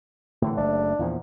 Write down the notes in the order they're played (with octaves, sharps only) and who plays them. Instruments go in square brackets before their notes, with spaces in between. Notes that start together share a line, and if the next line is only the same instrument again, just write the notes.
[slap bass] A2 D3 E3
[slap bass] F#1 A3 [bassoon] D4
[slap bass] E2 A#2 F3